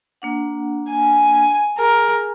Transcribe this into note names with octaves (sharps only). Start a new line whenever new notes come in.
A#3 D4 F#5
G#5
G#4 A#4